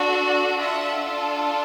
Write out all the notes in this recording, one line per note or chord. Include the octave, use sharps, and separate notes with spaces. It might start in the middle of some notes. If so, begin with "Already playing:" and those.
Already playing: D4 F#4 A4
D4 F4 A4 E5 F#5